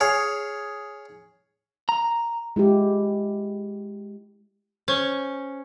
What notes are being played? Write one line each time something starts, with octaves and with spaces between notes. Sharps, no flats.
G#4 C#5 F5
A#5
G#3 E4 F4 G4
C#4 C5 C#6 G7